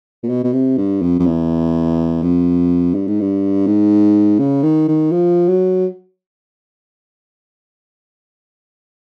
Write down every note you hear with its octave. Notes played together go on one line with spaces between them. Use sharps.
A#2
B2
B2
C3
G2
F2
F2
E2
F2
G2
G#2
G2
G#2
C#3
D#3
D#3
F3
F#3